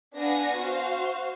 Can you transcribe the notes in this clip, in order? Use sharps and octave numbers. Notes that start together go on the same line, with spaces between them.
B3 D4 F5 F#5 G#5 A#6
F#4 C5 F5